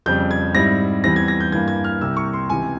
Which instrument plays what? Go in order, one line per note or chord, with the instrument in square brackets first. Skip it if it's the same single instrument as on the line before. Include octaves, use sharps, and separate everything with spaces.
[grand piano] F2 C#3 G3 C4 G6
G#6
G#2 G3 C4 E4 A#6
E2 E3 G3 C4 A#6
G#6
A#6
G6
G2 E3 A#3 G#6
G#6
F6
C2 C3 G3 E6
C#6
C6
C#2 C3 E3 G#5